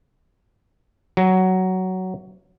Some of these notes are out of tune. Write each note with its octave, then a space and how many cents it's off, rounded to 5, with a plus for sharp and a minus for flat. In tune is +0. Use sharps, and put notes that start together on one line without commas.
F#3 +10